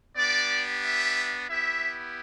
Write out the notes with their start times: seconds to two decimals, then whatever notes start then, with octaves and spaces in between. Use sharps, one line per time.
0.16 B3 D4 G4 D5
0.83 E5
1.49 B3 E4 G4 E5